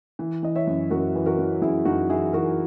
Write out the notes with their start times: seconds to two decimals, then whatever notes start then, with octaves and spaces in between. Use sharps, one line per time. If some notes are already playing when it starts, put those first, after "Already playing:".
0.19 E3
0.43 E3 D#5
0.56 C#5 E5
0.67 F#2
0.90 F#2 F#4 A#4
1.15 E3 B4
1.26 F#4 A#4
1.39 E3
1.62 F#2 E4 G#4
1.85 F#2 D#4 F#4
2.09 E3 E4 G#4
2.33 E3 F#4 A#4